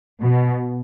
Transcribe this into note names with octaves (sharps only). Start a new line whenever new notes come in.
B2